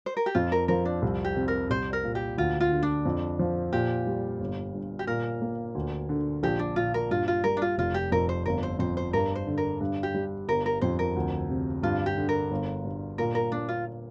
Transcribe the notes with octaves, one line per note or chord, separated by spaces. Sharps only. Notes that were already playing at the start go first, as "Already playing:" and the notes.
C5
A#4
G4
F2 F4
A#4
F3 A#4
D4
C2
G4
C3
A#4
C2 C5
A#4
A#2
G4
D2 F4
F4
D3
D4
F2
F3
A#2 G4
G3
G1
G2
G4
A#2 A#4
A#3
D2
D3
A#1 G4
D4
A#2 F4
A#4
G2 F4
F4
G3 A#4
D4
F4
F1 F4
G4
F2 A#4
C5
G1 A#4
C5
F2 C5
C5
G2 A#4
C5
D3
A#4
G2
G4
G3
G1 A#4
A#4
F2 C5
A#4
D2
C3
G2 F4
G4
D3
A#4
G1
G2
A#2 A#4
A#4
A#3 D4
F4